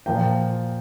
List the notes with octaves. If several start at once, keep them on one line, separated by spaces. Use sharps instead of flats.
A#2 F3 A#3 G5